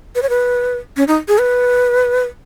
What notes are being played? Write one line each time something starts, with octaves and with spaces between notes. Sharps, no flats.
B4
C#5
B4
C#4
D#4
G#4
B4